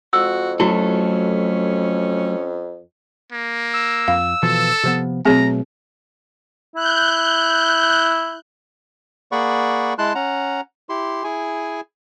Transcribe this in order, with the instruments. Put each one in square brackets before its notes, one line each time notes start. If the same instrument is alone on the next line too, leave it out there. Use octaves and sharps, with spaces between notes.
[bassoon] F2 [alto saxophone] F#4 [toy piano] E6
[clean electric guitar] F#3 A3 A4 [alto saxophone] C#4 [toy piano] E4 F#4
[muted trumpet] A#3
[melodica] E6
[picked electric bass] F2 [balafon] F5
[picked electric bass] B2 E3 F3 [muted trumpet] A4
[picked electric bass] C3 F3 B3
[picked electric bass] B2 F#3 A3 [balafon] C4 G#4 [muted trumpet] A#5
[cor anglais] E4 [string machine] F#6 G6
[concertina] A#3 G#4 D5 F#5 B5 C#6
G#3 E4 A5 C6 F#6
C#4 F#5 A#5
E4 G4 C6
E4 G#4 G#5